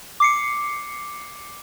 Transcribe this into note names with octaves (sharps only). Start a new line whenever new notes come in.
D6 C7 C#7